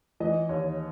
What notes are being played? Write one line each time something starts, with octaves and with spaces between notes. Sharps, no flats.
E3 D#5
D#2 C#5